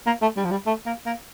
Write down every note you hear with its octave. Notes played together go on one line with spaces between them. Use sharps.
A#3
A3
G3
F3
G3
A3
A#3
A#3